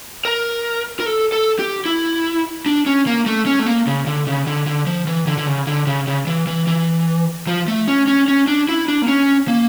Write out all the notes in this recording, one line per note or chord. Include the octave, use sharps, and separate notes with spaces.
A#4
A#4
A4
A4
G4
E4
D4
C#4
A#3
A3
C#4
A3
A#3
C#3
D3
C#3
D3
D3
F3
E3
D3
D3
C#3
D3
C#3
C#3
E3
E3
E3
F3
A3
C#4
C#4
C#4
D4
E4
D4
A#3
C#4
A#3